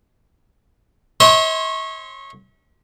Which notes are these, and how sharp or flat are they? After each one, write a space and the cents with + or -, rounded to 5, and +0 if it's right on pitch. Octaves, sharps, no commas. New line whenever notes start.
C#5 -20 E5 -45 C6 +0